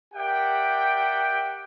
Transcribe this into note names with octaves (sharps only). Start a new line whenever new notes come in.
G4 A#4 D5 E5 F#5 G5